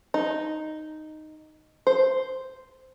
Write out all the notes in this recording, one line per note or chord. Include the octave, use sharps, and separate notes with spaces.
D#4
C5